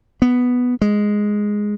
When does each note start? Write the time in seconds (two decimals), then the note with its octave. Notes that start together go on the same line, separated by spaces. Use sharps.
0.22 B3
0.81 G#3